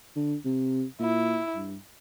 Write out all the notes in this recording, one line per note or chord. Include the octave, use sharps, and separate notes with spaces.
D3
C3
A#2 E4
G2